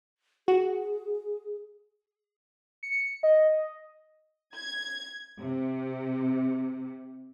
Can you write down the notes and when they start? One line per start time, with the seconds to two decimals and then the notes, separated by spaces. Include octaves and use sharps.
0.48 F#4 G#4
2.83 C#7
3.23 D#5
4.55 G#6
5.39 C3